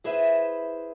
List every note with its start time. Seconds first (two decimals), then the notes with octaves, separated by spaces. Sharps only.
0.04 E4 G#4 B4 C5 E5